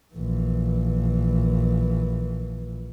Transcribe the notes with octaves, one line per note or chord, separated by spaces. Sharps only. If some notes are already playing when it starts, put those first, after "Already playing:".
A#1 E3